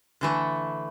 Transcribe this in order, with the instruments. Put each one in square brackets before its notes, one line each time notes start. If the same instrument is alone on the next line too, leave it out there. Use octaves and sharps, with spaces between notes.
[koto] D3 E3 A3